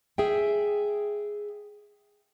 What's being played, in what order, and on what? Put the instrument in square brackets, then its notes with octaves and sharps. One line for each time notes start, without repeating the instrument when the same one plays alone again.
[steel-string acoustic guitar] G#4 E5 G5